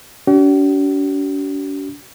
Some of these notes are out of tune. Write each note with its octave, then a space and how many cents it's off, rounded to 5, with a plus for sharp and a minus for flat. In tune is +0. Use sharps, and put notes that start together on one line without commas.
D4 -45 F#4 +45